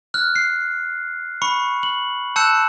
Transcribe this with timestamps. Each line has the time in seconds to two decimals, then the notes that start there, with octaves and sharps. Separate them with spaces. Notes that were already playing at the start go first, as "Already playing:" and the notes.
0.14 F6 F#6
0.36 C7
1.42 B5 C#6 C#7
1.83 F#7
2.36 A5 E6 F#6 G6 C#7 E7